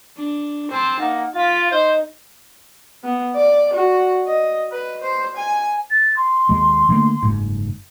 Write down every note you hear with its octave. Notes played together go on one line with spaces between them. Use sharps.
D4
C4 C5 A5
A#3 D#4 F#5
F4 F5 A6 B6
D#4 C5 D#5
B3
D5
F#4
D#5
B4
C5
G#5
A6
C6
D#2 G#3
D3 A3 A#3
F#1 G#2